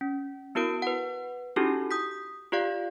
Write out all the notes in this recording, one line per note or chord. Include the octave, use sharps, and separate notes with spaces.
C#4
B3 E4 F#4 A#4 D7
B4 F#5
C#4 D#4 E4 F#4 G4 A4
D#6 G6 B6
F4 G4 D5 F5